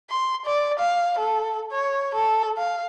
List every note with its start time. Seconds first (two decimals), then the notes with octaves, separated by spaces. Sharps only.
0.10 C6
0.46 D5
0.79 F5
1.19 A4
1.72 C#5
2.14 A4
2.58 F5